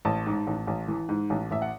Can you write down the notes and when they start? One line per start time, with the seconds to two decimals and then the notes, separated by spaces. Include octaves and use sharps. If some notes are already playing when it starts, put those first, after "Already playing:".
0.05 A1 A5
0.26 G#2
0.47 A1
0.67 A1
0.88 E3
1.09 G#2
1.30 A1
1.51 A1 E5
1.62 F#5